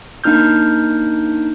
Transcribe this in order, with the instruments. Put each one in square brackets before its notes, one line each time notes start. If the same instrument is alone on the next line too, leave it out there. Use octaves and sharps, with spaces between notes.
[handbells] A#3 D4 D#4 F6 G6